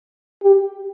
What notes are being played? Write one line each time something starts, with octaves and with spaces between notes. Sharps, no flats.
G4